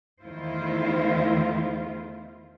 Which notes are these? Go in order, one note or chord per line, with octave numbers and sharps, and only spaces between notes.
E2 D#3 A3 E4 F4 C5